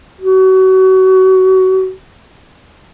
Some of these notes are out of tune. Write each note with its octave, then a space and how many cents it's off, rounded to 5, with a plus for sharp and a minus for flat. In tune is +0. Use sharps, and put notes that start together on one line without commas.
F#4 +30